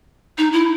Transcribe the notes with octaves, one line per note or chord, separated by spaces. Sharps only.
D#4
E4